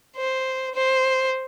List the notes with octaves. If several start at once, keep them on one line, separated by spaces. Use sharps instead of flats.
C5
C5